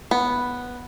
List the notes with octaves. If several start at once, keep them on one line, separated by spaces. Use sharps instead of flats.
B3